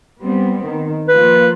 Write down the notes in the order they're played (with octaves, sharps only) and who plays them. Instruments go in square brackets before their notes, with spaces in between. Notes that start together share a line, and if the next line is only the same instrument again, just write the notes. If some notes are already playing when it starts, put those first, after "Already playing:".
[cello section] G3 B3 C4
D#3
[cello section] F3 A#3 F4 [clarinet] B4